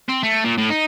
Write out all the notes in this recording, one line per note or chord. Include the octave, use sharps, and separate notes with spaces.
C4
A3
A#2
A2
D#4